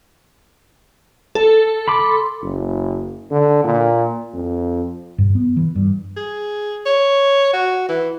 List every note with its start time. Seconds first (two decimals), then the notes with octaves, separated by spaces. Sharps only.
1.35 A4
1.88 B5 C6 D6
2.42 F#1
3.31 D3
3.64 A#2
4.34 F2
5.18 G2
5.35 B3
5.56 E3
5.75 G2
6.17 G#4
6.86 C#5
7.53 F#4
7.89 E3